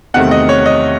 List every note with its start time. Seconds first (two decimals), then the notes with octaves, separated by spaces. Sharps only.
0.14 E2 C3 D#3 A3 C4 F#5
0.31 D#5
0.49 C#5
0.66 D#5